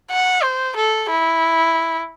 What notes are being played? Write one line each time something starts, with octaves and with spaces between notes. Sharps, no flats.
F#5
C5
A4
E4